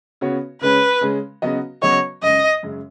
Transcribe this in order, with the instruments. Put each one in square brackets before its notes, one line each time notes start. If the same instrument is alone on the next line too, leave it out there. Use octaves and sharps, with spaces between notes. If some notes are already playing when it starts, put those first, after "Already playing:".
[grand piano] C#3 B3 F#4 C#5
[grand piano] C#3 G#3 C#4 [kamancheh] B4
[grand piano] C#3 G#3 C#4
C#3 F#3 B3 F#4 D#5
[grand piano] C#3 F#3 B3 F#4 D#5 [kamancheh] C#5
[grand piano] F#2 C#3 G#3 [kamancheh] D#5
[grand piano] F#2 C#3 G#3